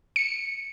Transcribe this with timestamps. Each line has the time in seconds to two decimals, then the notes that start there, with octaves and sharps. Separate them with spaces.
0.16 C#7